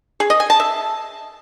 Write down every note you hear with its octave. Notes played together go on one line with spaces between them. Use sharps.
G#4
D#5
G#5
A5
E5